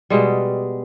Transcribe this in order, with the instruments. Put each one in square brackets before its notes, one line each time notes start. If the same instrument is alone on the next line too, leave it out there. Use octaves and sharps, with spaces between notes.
[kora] B2 G3 G#3